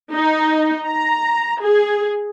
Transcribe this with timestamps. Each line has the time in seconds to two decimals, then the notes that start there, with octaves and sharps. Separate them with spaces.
0.12 D#4
0.85 A#5
1.61 G#4